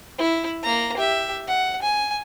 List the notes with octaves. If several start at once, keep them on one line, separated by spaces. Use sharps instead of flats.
E4
A#3 A#5
G4 E5
F#5
G#5